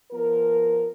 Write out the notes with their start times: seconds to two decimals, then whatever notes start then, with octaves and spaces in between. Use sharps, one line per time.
0.12 F3 B3 A#4